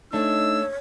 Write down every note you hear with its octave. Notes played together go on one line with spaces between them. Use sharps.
A3 D4 D#4 C#5 E6